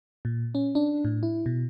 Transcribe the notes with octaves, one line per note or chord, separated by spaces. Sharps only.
A#2
C#4
D4
A2
E4
B2